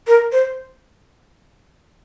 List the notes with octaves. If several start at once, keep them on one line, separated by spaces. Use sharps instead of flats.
A#4
C5